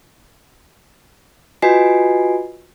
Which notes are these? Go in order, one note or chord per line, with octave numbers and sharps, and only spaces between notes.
F4 F#4 B4 D#5 G#5 C7